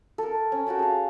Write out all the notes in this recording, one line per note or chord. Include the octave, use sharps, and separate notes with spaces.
A4 A#4
C#4
F#4 G5 A5 B5
G#4 F5